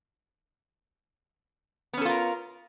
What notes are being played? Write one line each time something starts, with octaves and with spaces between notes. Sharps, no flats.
B3 C#4 F4 A4 A#4